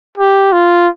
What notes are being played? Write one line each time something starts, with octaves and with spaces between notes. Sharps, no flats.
G4
F4